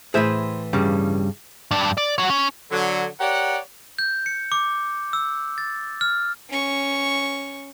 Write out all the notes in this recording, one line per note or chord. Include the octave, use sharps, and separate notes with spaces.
A2 E3 G#4 B4 C5 E5
G2 C#3 G3
G2 D4
D5
F#4 C#5
C#4
D3 F#3
G4 A#4 C#5 D5 F#5
G6
C#7
D6
E6
A6
F6
C#4 C#6